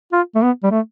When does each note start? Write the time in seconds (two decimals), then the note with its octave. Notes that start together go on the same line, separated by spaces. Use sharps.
0.12 F4
0.35 A3
0.42 B3
0.64 G3
0.71 A3